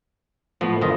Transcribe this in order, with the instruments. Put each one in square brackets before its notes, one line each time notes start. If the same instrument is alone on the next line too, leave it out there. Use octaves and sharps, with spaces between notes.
[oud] A2 [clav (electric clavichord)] F3 B3
[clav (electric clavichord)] G1 F4 D#5 [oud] D#3